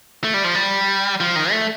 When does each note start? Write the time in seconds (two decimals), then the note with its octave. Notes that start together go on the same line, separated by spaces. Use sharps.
0.24 A3
0.34 G3
0.44 F3
0.54 G3
1.20 F3
1.36 D#3
1.51 A3